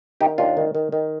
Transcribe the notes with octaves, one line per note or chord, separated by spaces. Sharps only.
D#3 D#4 G4
D#2 D4 F4
D#3
D#3
D#3